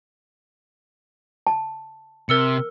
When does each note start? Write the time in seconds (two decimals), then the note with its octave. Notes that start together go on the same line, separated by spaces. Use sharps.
1.47 A5
2.29 C3 A#4 E6 C#7